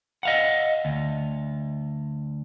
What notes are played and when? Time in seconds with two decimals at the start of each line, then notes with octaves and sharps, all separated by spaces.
0.23 D#5 F5 F#5
0.85 D2